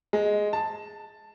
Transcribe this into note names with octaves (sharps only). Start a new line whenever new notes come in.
G#3
A5